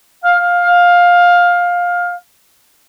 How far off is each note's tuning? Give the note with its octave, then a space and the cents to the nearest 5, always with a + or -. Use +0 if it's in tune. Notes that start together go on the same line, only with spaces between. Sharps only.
F5 +15